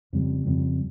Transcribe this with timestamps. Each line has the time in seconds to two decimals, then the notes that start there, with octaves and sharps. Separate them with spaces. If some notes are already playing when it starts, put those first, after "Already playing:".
0.13 F2 C#3 G3 C4
0.46 F2 C#3 G3 C4